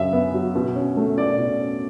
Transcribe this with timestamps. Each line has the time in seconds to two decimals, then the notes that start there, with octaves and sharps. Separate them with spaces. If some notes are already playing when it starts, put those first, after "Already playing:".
Already playing: F#2 C#3 F#3 E5
0.13 B3
0.34 F#3
0.55 B2
0.76 C#4
0.97 A3
1.18 B2 D5
1.38 B2
1.60 C#4